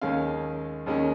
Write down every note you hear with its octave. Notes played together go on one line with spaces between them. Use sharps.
D#2 D#3 G#3 C#4 F5
D#2 D#3 G#3 C#4